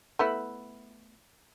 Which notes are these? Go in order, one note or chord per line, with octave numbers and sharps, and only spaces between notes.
A3 B3 E4